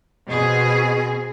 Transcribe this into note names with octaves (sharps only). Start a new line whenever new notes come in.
B2 C4 G#4